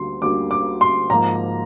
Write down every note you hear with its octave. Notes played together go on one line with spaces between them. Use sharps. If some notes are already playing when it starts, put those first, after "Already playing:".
Already playing: D2 D3 G3 A#3 C6
D2 D3 G3 A#3 D6
D6
C6
G#2 F3 A#3 A#5